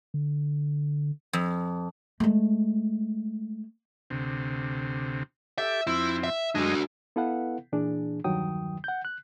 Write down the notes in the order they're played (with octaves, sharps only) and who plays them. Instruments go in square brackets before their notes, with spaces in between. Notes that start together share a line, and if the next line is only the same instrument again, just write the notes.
[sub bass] D3
[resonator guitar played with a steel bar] F2
[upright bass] G#3 A3
[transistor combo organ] D2 C3
[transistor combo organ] G4 A4 D6 [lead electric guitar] E5
[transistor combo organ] F2 C4 [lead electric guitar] E4
[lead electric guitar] E5
[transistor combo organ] F#2 G#3 D#5 [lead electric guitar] D4 F#4
[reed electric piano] B3 E4 A4 B4 F5 F#5
A#2 E3 D4 G#4
E2 G2 D#3 F#3 G5 D#6
F#5 G6
F#6